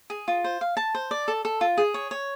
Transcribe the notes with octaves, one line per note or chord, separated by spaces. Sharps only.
G#4
F4
C5
F5
A5
C5
D5
A4
A4
F4
G#4
C#5
C#5